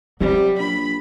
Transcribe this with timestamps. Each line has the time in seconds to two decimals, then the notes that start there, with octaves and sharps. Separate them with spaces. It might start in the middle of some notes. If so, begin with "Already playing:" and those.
0.21 C3 F#3 G3
0.59 A#1 B5